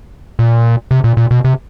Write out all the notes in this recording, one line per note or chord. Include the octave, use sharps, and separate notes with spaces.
A#2
C3
A#2
A#2
B2
C3